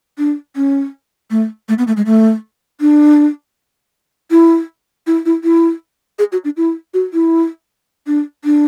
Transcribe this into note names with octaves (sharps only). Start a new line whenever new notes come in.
D4
C#4
A3
A3
B3
A3
G#3
A3
D4
E4
E4
E4
E4
G#4
F#4
D4
E4
F#4
E4
D4
D4